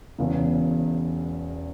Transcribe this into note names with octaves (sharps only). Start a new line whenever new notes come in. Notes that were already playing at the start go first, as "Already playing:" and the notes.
E1 E2 C#3